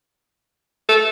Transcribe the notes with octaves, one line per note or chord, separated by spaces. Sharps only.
A4